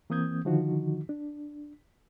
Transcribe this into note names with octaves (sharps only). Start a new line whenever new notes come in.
E3 A#3 C4 D#6 G6 G#6
D3 D#3 F3 D#4 F#4
D4